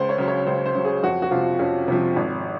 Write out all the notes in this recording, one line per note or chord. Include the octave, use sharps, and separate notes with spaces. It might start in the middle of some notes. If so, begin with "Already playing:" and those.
Already playing: C#2 C5
C#5
C#3 F#3
C#5
C#2 C5
C5
C#3 F#3
G#4
F2 F#4
F#4
C3 F3 F4
F2 C#4
C3 F3
G#1